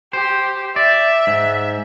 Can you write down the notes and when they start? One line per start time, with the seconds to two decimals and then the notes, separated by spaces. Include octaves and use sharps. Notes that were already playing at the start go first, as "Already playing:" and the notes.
0.13 G4 C5
0.76 D5 E5
1.27 G#2